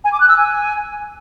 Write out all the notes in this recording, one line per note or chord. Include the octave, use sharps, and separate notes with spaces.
G#5
D6
F#6
E6
G#5